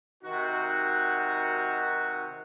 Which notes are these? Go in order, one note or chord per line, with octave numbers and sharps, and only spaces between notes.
C3 D#3 D#4 F#4